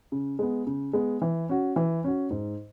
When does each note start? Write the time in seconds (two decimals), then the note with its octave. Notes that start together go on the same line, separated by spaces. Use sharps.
0.12 C#3
0.39 G#3 B3
0.67 C#3
0.93 G#3 B3
1.22 E3
1.49 C#4 F#4
1.76 E3
2.04 C#4 F#4
2.31 G#2